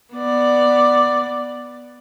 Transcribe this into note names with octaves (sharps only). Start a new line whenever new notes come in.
B3 D5